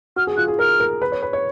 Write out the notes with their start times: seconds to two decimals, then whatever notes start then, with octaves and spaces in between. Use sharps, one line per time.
0.16 F#4 F6
0.27 G#4
0.37 F4 F#6
0.48 G#4
0.59 A#4 F6
0.80 A#4
1.02 B4
1.12 C#5
1.23 B4
1.33 C#5